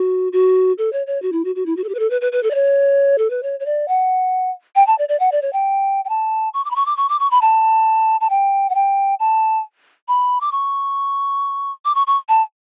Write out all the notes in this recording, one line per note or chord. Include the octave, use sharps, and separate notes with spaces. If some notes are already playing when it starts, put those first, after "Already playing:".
Already playing: F#4
F#4
A4
C#5
C#5
F#4
E4
F#4
F#4
E4
F#4
A4
G4
B4
A4
B4
B4
B4
A4
D5
C#5
A4
B4
C#5
C#5
D5
F#5
G5
A5
D5
D5
F#5
D5
C#5
G5
G5
A5
C#6
D6
B5
C#6
D6
C#6
D6
C#6
B5
A5
A5
G5
F#5
G5
A5
B5
D6
C#6
D6
C#6
C#6
A5